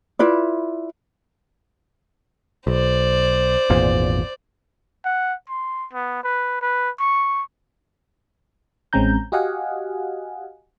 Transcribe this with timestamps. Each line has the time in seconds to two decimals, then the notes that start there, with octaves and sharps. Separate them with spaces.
0.19 E4 F4 B4 D5
2.67 B1 C5 D5
3.70 G#1 E2 A#2
5.05 F#5
5.49 C6
5.93 B3
6.24 B4
6.62 B4
6.99 C#6
8.93 A1 G#3 C4 C#4 A#5 G6
9.32 F#4 G4 D#5 F5 F#5 G#5